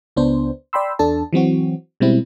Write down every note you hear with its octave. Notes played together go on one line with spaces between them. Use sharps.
C#2 B3 D4 C5
D5 G5 B5 C6 E6
E2 D4 A4 A5
E3 F#3 C4 F#4
B2 G3 G#3 C4 E4